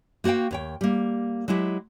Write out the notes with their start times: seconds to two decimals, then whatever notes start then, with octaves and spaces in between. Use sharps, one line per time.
0.24 A#3 F#4 C5 F5 G5
0.51 D#2 C#5 G5
0.81 G3 A#3
1.48 F#3 G#3 E4 G4